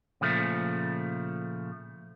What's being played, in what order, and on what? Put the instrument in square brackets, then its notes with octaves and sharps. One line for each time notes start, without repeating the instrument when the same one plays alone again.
[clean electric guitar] A#2 C#3 F3 A3